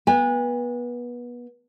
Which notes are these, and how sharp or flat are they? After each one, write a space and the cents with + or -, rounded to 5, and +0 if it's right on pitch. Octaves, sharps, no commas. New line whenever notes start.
B3 -25 G#5 -40